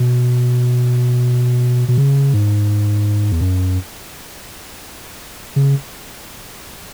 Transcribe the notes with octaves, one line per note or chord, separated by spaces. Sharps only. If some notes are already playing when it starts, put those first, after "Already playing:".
Already playing: B2
B2
C#3
G#2
E2
F#2
C#3